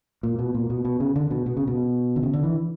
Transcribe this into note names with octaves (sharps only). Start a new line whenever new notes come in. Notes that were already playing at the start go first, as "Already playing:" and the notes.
A#2
B2
A#2
B2
B2
C#3
D3
B2
B2
C#3
B2
D3
C#3
D3
E3